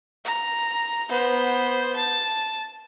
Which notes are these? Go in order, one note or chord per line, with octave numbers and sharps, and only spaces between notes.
A#5
B3 C5
A5